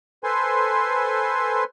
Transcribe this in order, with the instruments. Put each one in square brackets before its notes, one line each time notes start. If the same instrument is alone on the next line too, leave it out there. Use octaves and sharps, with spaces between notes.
[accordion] A4 B4 C5 G#5 C6